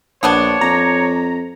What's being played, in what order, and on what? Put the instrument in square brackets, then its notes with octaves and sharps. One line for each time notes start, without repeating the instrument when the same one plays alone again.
[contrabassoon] A#1 [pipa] F3 B3 D4 [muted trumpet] C#5
[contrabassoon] F2 [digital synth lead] A#5